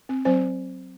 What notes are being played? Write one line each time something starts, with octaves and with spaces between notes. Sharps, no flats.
C4
F#3 C4 C5